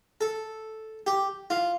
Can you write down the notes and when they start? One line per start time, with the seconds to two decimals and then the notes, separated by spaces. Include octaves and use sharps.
0.21 A4
1.07 G4
1.50 F4